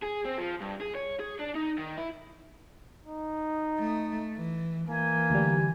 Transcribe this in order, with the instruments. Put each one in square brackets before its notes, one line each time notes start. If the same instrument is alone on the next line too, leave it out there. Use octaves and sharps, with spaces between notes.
[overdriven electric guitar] G#4
C4
F3
G2
G#4
C#5
G#4
D4
D#4
D#3
E4
[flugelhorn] D#4
[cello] A3
E3
[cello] E3 [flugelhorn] A#3 [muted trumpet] G#5
[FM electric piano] D2 G3